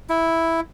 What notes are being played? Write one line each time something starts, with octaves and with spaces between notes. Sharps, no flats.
E4